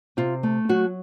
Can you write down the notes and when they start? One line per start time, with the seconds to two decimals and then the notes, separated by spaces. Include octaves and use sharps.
0.17 C3 F4
0.43 A3
0.69 F#3 F#4